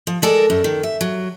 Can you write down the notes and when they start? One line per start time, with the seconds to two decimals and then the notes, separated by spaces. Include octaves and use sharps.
0.07 F3
0.22 G#3 A4 A#4 D5
0.50 F#2
0.64 D#3
0.83 E5
1.01 F#3